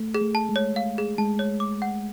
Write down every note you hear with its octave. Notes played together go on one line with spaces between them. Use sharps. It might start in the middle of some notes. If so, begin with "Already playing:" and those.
Already playing: A3
G#4
A3
A5
G#3
C#5
F5
G#4
G#3 A5
C#5
D6
F#5